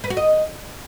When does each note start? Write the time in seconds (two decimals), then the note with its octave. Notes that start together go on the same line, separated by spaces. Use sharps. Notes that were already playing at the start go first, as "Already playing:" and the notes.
0.04 B4
0.10 F#4
0.17 D#5